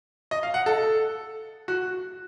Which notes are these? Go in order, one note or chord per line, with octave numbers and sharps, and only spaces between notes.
D#5
F5
F#5
A4
F#4